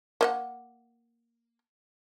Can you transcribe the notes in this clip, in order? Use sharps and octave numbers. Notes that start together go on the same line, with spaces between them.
A#3 D#5 F#5